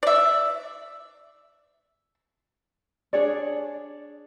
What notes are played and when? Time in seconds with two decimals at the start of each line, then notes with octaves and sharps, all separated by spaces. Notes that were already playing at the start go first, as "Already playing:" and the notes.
0.03 D5 E5
3.13 D4 G#4 C#5 D5